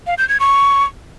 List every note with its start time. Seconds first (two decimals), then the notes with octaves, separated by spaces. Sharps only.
0.07 F5
0.18 G6
0.29 G#6
0.40 C#6